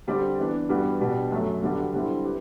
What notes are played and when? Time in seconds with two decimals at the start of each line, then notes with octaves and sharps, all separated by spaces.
0.07 D3 G3 C4 G4 D5
0.39 E3 B3 D4
0.69 G2 E3 G3 B3 F#4
1.00 B2 G3 D4 F#4
1.31 F#2 F#3 A3
1.62 G2 D3 G3 D4 F#4
1.94 D3 G3 C4 E4
2.24 G4 B4